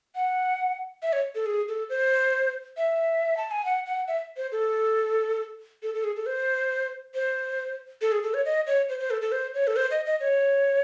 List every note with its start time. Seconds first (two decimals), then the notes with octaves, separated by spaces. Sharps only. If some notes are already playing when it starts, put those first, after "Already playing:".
0.15 F#5
1.02 E5
1.13 C#5
1.35 A4
1.46 G#4
1.68 A4
1.89 C5
2.77 E5
3.37 A5
3.51 G#5
3.65 F#5
3.86 F#5
4.08 E5
4.37 C5
4.52 A4
5.83 A4
5.94 A4
6.04 G#4
6.16 A4
6.26 C5
7.15 C5
8.02 A4
8.12 G#4
8.23 A4
8.34 C#5
8.45 D#5
8.67 C#5
8.89 C5
9.00 C5
9.10 A4
9.22 A4
9.32 C5
9.54 C#5
9.67 A4
9.76 C5
9.91 D#5
10.06 D#5
10.20 C#5